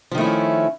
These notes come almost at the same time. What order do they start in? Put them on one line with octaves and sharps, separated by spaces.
F3 D#3 A3 E4 C#4